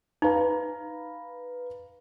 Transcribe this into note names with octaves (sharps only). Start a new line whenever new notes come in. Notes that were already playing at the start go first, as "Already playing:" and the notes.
D#4 B4 F5 A#5